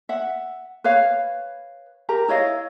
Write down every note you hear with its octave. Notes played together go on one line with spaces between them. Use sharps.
E5 F#5
B4 C#5 F5
G4 A#4 A#5
E4 C#5 D#5 F5